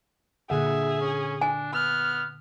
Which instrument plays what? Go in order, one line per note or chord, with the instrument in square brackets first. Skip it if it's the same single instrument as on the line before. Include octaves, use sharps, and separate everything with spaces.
[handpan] A#2 D3 F#5 [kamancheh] G#4 [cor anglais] E5
[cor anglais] C#4
[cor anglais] D4 [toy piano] G#5
[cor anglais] B3 [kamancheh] F6